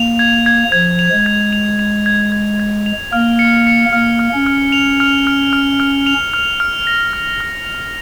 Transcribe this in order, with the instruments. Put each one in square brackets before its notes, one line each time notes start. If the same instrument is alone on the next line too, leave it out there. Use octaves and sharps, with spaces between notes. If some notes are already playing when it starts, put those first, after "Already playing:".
Already playing: [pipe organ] A#3 [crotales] F7
[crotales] G#6
G#6
[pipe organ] F3 [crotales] G#6
[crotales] F7
[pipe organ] G#3
[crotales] G#6
F7
F7
G#6
G#6
G#6
F7
[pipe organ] A#3 [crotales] F6
[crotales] C#7
C#7
[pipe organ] A#3 [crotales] F6
[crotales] F6
[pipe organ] C#4
[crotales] F6
F7
F6
F6
F6
F6
F7
F6
F6
A#6
F6
F6
F7